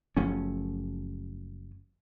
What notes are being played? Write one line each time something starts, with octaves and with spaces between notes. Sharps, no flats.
F#1 F3 A3 C#4